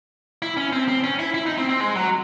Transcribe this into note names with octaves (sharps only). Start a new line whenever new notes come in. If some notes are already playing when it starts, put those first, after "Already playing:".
E4
C#4
C4
C4
C#4
E4
E4
D#4
C4
C4
G#3
F#3